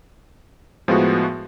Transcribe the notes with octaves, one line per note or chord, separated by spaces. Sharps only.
A2 F3 G#3 B3 F#4